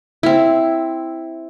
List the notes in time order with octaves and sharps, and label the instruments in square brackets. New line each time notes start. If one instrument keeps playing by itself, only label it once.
[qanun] C4 E4